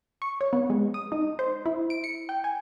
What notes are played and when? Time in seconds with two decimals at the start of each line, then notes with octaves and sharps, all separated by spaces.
0.22 C#6
0.41 C#5
0.53 B3
0.70 G#3
0.94 D#6
1.12 D#4
1.39 C5
1.66 E4
1.90 D7
2.04 C#7
2.29 G5
2.44 G#5